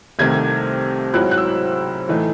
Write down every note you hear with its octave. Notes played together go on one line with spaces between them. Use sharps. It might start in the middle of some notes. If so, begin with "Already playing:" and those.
C2 C3 D#3 A3 C4 G#6
G#2 F#3 C4 E4 F#6
F#6
E6
A2 E3 A3 D#4